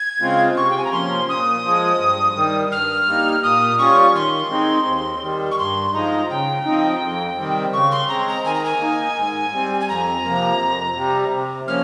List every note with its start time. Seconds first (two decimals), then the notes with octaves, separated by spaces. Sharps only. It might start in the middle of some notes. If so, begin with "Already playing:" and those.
Already playing: G#6
0.20 C#3 G#3 C4 F4
0.56 C3 C#6
0.70 G5
0.77 G#5
0.84 A#5
0.91 F3 A#3 C#4 C6
1.28 A#2 D#6
1.64 F3 G#3
1.99 G2
2.35 D#3 G3
2.71 G2 F6
3.07 G3 A#3 D#4
3.43 A#2 D#6
3.78 G3 C#4 F4 C#6
4.14 D#3 C6
4.50 G#3 C4 D#4
4.86 D#2
5.21 D#3 G3
5.51 C#6
5.58 G2 C6
5.93 F3 G#3 D#4 A#5
6.30 C#3 G5
6.65 F3 C4 D#4
7.02 F2
7.38 C3 D#3 G3 C4
7.73 C#3 C#6
7.91 C6
8.08 G#3 C4 A#5
8.27 A#5
8.44 D#3 G#5
8.55 A#5
8.65 G#5
8.80 A#3 D#4
9.16 G#2
9.53 G3 C4
9.80 G#5
9.88 F2 A#5
10.24 C3 F3 A#3
10.59 F2
10.96 C3 G3
11.32 C3
11.67 F3 A#3 C#4 F6